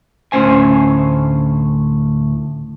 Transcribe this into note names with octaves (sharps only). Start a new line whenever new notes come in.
D2 A2 C4 C#4 C5 G#5